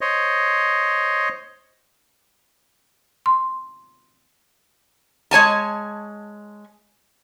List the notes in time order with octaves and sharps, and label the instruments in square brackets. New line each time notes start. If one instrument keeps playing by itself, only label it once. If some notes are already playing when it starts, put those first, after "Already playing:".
[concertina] C5 C#5 D#5
[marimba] C6
[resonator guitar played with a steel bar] G#3 C#5 G#5 A5